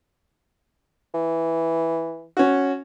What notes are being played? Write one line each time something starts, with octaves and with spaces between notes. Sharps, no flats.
E3
C#4 F#4